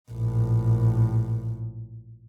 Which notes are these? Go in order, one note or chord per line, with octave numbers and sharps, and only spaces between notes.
A#1 A2